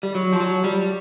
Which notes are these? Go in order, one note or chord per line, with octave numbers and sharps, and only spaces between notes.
G3
F#3
F3
F#3
G3